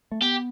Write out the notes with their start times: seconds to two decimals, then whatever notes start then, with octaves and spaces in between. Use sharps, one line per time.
0.12 A3
0.21 B3 G4